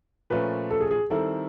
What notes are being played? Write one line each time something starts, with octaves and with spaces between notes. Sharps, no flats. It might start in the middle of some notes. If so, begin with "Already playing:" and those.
A#2 F3 A3 C#4 B4
A4
G#4
G#4
D#3 G3 C4 E4 A4